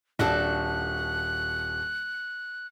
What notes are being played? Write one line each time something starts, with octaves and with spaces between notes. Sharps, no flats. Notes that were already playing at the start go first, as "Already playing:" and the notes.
D#1 D4 F#4 A4 F#6